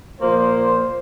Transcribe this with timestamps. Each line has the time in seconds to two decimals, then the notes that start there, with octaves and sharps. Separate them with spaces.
0.20 A#2 F3 A#3 C5